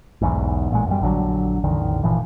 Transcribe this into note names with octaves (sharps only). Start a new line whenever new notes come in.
B1 E2 G#2
A1 A#2 G#3
F#2 G3
A#1 D3 E3 F#3
A1 E2 D3 D#3
G1 A#2 E3 F3